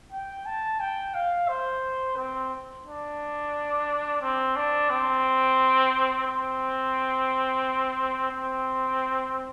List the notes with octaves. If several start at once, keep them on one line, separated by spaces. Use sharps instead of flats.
G5
A5
G5
F5
C5
C4
D4
C4
D4
C4
C4
C4